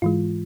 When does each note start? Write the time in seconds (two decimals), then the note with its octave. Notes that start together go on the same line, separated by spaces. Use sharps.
0.02 G#2 E3 G#3 F4